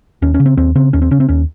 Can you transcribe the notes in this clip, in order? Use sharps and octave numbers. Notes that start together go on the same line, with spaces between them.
D#2 C#4
C#4
C#3
C4
D#2 C4
C#3 C4
D#2 C#4
C4
C#3 C#4
C4
D#2 C#4